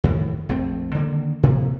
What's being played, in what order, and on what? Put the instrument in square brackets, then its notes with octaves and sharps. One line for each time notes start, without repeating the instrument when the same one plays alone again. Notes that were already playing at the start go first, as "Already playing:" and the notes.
[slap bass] F2 A2 D#3 E3
A#1 F2 A3 C4
D3 D#3 A3 A#3
A2 C3 F3 A#3